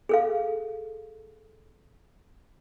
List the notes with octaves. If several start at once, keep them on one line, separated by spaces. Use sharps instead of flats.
G#4 A4 F5